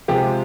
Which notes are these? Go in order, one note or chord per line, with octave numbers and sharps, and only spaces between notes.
C3 F3 G#3 G4